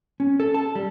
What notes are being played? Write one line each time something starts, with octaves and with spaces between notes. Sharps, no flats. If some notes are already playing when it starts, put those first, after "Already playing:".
C#4
A4
A5
G3